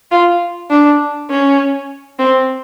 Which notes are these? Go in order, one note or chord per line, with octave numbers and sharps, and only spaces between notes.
F4
D4
C#4
C4